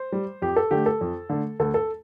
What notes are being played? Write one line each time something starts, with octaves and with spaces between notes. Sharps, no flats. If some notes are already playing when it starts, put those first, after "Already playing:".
Already playing: C5
G3
F2 G4
A4
D3 A3 G4
A4
F2
D3 A3
D2 A4
A4